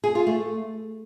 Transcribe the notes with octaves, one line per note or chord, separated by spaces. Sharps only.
G#4
F4
A3